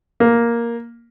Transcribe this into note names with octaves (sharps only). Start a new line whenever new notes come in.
A#3